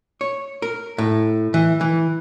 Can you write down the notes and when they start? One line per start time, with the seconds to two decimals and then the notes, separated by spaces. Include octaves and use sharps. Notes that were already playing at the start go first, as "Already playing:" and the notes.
0.21 C#5
0.62 A#4
0.98 A2
1.54 E3
1.81 E3